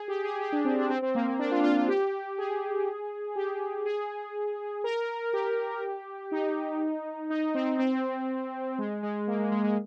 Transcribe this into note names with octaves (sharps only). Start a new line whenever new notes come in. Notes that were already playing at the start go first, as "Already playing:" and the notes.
Already playing: G#4
G4
G#4
G4
D4
C4
D4
C4
C4
A#3
A#3
D4
F4
F4
F4
G4
G#4
G4
G#4
A#4
G4
D#4
D#4
C4
C4
G#3
G#3
A#3
G#3
G#3
G#3